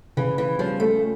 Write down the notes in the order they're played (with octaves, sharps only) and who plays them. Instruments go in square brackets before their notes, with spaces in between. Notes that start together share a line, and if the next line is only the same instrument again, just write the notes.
[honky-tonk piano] C#3 [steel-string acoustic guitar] E3
[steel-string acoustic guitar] E3
[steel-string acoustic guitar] F3 [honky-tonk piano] G3 C#4 F4
[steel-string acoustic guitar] A3